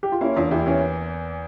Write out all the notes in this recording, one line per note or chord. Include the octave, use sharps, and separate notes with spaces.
G4
F4
A#3 C#4 E4
E2 D4 F4
E2 E4 G4
E3 C#4 E4